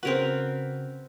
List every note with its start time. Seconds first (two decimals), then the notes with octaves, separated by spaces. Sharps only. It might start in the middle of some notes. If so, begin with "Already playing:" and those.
0.03 C#3 C4 F#4 A#4 B4